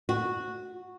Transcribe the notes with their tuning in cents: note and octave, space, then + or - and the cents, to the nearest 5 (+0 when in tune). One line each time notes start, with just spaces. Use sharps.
F#4 -10